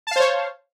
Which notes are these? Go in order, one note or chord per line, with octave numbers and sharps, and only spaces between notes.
C5 C#5 F5 A5